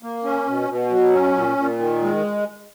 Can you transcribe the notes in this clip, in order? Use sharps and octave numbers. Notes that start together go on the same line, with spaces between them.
A#3
C#4
B2
B2
F#3
C#4
A#2
A#2
D#3
G#3